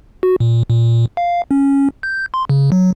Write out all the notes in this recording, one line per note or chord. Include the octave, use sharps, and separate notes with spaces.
F#4
A#2
A#2
F5
C#4
G6
C6
C#3
F#3